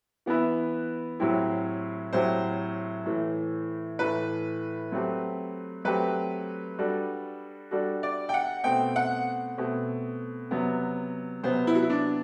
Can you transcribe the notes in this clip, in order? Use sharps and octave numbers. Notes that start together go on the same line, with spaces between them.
E3 B3 E4 B4 E5
A2 F#3 C4 E4 G4
A2 F#3 C4 E4 G4 C5
A2 E3 A3
A2 E3 A3 B4
F#3 A3 C4 G4
F#3 A3 C4 G4 B4
G3 D4 F#4 A4
G3 D4 F#4 A4
D5
G5
F#5
B2 A3 C4 G5
F#5
B2 A3 C4
C3 F#3 B3
C3 F#3 B3 C5
E4
F#4
E4
D4